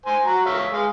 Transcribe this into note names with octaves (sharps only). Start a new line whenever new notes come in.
C5 G#5
F#4 A#5
C#5 E5 F5
G#3 F5